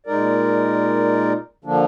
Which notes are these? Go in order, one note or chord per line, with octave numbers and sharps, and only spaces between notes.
A#2 G#3 D#4 A#4 D5
D3 F3 A#3 D4